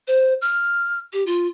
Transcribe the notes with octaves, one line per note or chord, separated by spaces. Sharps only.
C5
F6
G4
F4